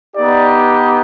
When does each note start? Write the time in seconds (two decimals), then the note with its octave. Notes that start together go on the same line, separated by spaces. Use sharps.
0.16 B3 D#4 G4 D5